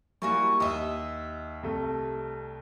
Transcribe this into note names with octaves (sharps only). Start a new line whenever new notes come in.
G3 A#3 E4 F#4 G#5 C#6
D#2 D#5 E5
C2 A3